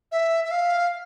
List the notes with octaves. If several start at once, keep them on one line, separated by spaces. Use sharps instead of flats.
E5
E5
F5